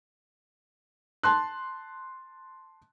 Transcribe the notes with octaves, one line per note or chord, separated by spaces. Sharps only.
A5 C6 F#6